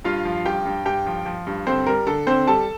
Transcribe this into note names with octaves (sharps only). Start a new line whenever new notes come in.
G2 F4 F5
F3
G2 G4 G5
G2
G2 G4 G5
F3
F3
G2
D3 C4 C5
G3 A#4
D3 A4
D3 C4 C5
G3 A4 A5